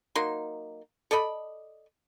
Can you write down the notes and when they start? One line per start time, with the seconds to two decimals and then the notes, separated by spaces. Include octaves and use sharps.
0.15 F#3 A#3 D#4 C6
1.11 A4 D5 D#5 B5